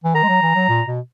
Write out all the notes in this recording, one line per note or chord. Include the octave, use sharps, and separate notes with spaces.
E3
D#3 A#5
G#3
F#3
E3
F#3
A#2
B2